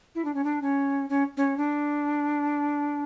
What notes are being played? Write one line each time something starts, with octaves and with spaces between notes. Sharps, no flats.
E4
D4
C#4
D4
C#4
C#4
C#4
D4